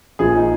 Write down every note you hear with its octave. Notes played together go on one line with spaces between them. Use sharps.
A#1 A#2 F3 G#4
D#4